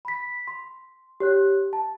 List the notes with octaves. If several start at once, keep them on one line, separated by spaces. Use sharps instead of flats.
B5 B6
C6
G4 C#5 F#6
A5